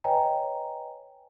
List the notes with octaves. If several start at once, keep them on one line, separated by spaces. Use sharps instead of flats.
B4 C#5 D#5 G5 G#5 A#5